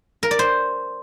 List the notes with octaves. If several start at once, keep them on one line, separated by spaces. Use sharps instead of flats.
A#4
D5
C5